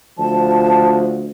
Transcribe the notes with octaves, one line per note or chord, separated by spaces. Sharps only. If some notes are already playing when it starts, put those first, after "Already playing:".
D2 F3 A5